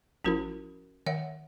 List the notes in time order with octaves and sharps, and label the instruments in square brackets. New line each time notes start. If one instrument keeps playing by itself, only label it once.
[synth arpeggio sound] A1 F3 E4 [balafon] C#4 F#4 A#4
[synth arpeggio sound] D#3 [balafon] C#5 E5 F#5